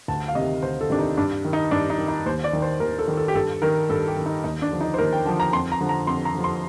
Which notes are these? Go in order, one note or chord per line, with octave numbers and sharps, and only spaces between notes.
D2 A5
F5
C3 D#3 D#5
D2 C5
A4
C3 D#3 D4
D#4
G2 D4
D#3
D#4
G2 D4
D#4
D#3
D#4
D#2 C5
D5
D#3
C5
D#2 A#4
A4
D#3
A4
G4
G2 A4
D#3 A#4
G2 A4
G4
D#3
D#4
D#2 D#4
D4
D3 F3
D#4
C5
D#2 A#4
G5
D3 F3 A5
A#5
F2 C6
A#5
D3 F3
A#5
F2 C6
A#5
D3 F3
C6